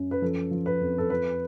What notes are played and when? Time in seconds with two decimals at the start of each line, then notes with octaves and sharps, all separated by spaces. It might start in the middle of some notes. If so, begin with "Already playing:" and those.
Already playing: F#2
0.11 B4
0.22 F3 A4
0.51 F3
0.66 B4
0.81 F2
0.98 A4
1.10 F3 B4